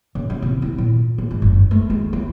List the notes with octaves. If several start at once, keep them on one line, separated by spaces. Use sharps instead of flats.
C#3
C#3
C3
E4
A#2
F4
G#2
F#1
A3
G#3
E4